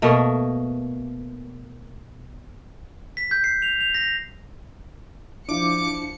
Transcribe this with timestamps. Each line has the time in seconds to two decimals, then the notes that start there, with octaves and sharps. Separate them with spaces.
0.02 B2 A3 A#3
3.17 B6
3.31 G6
3.44 C7
3.62 F7
3.81 F7
3.94 A#6
5.49 F3 D4 E4 F4 D6 C#7